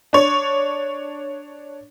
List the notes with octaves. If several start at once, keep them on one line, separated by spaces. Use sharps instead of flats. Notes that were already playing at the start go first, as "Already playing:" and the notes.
D4 C#5